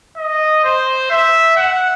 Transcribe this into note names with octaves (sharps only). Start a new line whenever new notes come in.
D#5
C5
E5
F#5